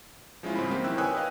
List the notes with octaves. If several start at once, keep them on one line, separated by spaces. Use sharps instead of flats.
F3 G#3 C#4 E4 F4
G#2 C#3 G3 C4 B5
A#3 C4 G4
D#3 E4 E6 F#6
B4 C#5 G5 G#5 D#6 F#6
B4 D#5 F5